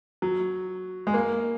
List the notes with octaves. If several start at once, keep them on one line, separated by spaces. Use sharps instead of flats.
F#3
G#3
A#3